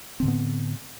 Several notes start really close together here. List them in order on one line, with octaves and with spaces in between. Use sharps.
C4 D3 A2 B3